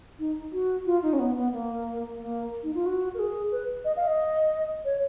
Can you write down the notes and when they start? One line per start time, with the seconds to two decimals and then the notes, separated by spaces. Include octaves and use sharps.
0.19 D#4
0.53 F#4
0.86 F4
1.03 D#4
1.13 C#4
1.19 B3
1.36 B3
1.52 A#3
2.18 A#3
2.63 D#4
2.75 F4
2.86 F#4
3.14 A#4
3.19 G#4
3.52 B4
3.85 D#5
3.97 F5
4.07 D#5
4.85 C#5